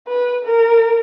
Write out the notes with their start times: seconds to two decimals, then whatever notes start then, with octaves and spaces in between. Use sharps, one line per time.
0.08 B4
0.45 A#4